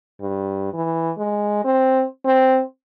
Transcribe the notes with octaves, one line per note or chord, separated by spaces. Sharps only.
G2
E3
G#3
C4
C4